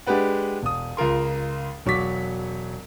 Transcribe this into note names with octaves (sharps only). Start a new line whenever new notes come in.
G#3 D4 G4 B4 F#5
E1 D#6
C#2 F4 A#4 C6
E1 F#3 C#6 D6 B6